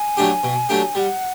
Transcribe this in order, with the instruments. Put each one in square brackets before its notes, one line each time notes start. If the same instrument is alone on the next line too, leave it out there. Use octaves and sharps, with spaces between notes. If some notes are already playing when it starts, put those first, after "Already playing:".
Already playing: [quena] G#5
[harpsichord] F#3 A3 D4 G4
B2
F#3 A3 D4 G4
[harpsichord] G3 [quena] F#5 G5